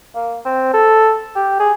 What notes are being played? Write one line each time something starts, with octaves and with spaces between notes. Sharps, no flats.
A#3
C4
A4
G4
G#4